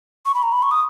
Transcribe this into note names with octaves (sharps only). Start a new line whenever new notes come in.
C#6
B5
A#5
B5
C#6
D#6